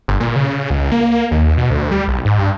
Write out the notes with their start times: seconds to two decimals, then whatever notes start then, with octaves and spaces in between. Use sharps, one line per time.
0.08 G1
0.20 A#2
0.36 C#3
0.70 C#2
0.92 A#3
1.31 D#2
1.57 B2
1.70 D2
1.91 G3
2.08 B1
2.25 G#2
2.38 G2